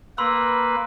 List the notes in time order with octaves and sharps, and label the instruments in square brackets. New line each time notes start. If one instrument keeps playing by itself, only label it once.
[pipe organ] A#3 B4 [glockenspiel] B5 C6 E6